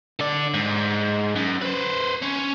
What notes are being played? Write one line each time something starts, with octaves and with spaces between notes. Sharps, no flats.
D3 D5
G#2
F#2
B4 C5
C#4